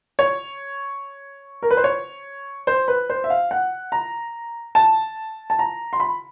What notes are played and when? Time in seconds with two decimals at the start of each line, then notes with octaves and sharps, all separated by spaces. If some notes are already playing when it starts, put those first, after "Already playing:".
0.19 C#5
1.63 A#4
1.71 B4
1.77 C5
1.84 C#5
2.67 C5
2.88 B4
3.10 C5
3.24 E5
3.30 F5
3.51 F#5
3.92 A#5
4.75 A5
5.50 A5
5.59 A#5
5.93 C6
6.00 B5